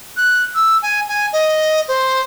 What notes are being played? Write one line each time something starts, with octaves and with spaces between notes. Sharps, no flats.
F#6
E6
G#5
G#5
D#5
C5